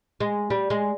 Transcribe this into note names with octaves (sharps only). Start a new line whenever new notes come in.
G#3
G3
G#3